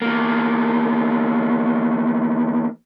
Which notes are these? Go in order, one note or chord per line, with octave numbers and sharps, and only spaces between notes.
E2 A#3